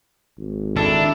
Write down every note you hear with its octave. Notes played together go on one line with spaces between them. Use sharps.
G#1
D#3 D4 E4 A4